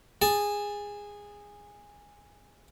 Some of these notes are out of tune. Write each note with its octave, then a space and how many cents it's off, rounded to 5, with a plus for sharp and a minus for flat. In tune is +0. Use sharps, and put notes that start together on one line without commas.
G#4 -15 A5 +0